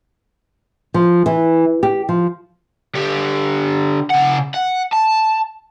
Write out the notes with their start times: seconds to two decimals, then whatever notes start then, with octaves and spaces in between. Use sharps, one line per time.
0.94 F3
1.26 E3
1.83 G4
2.09 F3
2.95 D3 G4
4.10 C#3 F#5
4.54 F#5
4.93 A5